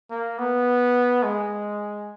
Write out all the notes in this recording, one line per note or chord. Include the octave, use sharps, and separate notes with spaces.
A#3
B3
G#3